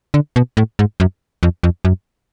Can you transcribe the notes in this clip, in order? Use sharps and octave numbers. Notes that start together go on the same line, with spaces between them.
D3
B2
A2
G#2
F#2
F2
F2
F#2